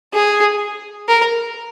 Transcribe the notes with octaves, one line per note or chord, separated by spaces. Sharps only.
G#4
A#4